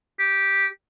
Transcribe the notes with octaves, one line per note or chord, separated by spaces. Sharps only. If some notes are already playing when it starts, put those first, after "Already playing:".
G4